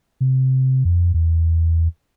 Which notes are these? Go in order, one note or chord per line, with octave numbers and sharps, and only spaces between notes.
C3
F2
E2